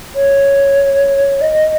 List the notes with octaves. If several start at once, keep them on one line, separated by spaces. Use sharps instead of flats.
C#5
D#5